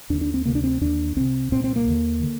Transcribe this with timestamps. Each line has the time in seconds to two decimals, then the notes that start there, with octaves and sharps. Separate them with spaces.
0.10 D#2 D3 D4
0.21 D4
0.34 C4
0.45 D2 C3 A#3
0.55 D4
0.64 C4
0.81 D#2 D3 D4
1.16 C2 C3 C4
1.52 C2 A#2 C4
1.64 C4
1.76 A#3
1.88 D#2 D3
2.23 D3